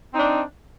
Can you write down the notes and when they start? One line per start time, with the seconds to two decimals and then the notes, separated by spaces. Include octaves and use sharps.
0.12 C4
0.15 D#4
0.19 D4